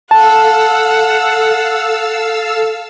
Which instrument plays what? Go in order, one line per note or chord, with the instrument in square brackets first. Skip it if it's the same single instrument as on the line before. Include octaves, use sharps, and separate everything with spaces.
[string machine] A4 F5 E6 [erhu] F#5 [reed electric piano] A5